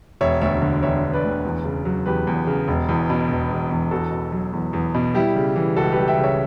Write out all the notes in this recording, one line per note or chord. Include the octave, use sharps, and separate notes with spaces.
E1 C#5 E5
D2 C#5 E5
D3
E1 C#5 E5
E1
B4 D5
D2
E2
C#3
F#3
E2 G4 B4
E2
C#3
E1
E2
B2
E1
E1
E2
E2 F#4 A4
B2
F#3
E2
E2
B2
G3 E4 G4
C#3
E3
C#2 F#4 A4
G4 B4
G3
E5 G5
C#3
C#5 E5